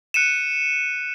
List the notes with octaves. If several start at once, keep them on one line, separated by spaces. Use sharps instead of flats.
F#6 C#7 D#7 E7